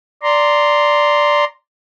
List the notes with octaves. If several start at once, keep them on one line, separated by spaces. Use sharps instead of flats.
D5 A#5 C6